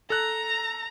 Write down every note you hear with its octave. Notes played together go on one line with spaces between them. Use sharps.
A4 A#5 F#6